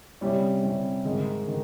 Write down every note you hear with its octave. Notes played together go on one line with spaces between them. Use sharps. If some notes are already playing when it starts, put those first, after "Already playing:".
C3 G3 C#4
C3 G3 C#4
G#2 D#3 G#3 D#4
D#3